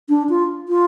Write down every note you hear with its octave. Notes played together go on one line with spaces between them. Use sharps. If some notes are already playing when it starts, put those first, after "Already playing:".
D4
F4
F4